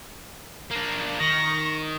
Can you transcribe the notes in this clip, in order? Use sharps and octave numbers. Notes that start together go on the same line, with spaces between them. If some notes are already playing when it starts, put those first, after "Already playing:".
A#3 D4
D#3 C#6 A#6